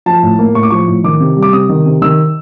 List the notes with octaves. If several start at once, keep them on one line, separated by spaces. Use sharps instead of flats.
F3 A5
A2
A#3
A2 C#6
D6
F3 C#6
A2
D#3 D6
C3
G3
D6
C3 D#6
D#3
C3
D#3 E6